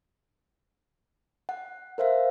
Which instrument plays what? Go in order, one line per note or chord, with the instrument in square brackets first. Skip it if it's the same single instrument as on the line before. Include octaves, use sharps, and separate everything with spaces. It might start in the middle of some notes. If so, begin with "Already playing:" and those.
[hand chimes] F#5
A#4 C5 E5 F5